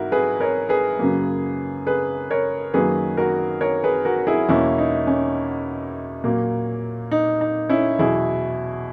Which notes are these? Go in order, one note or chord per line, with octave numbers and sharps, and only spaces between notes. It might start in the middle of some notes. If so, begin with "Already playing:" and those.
Already playing: G#2 E4 F#4 A#4
G#4 B4
A#4 C#5
G#4 B4
F#2 C#3 F#3 A#3
G#4 B4
A#4 C#5
F#2 D#3 F#3 A#3 G#4 B4
F#4 A#4
A#4 C#5
G#4 B4
F#4 A#4
E4 G#4
E2 B2 A#3 C#4 E4
D#4
C#4
A#2 F#3 A#3
D#4
D#4
C#4 E4
E2 B2 F#3 E4 G#4